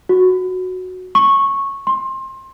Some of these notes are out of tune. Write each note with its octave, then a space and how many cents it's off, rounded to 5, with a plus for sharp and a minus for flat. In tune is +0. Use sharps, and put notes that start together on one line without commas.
F#4 -5
C#6 -10
C6 +25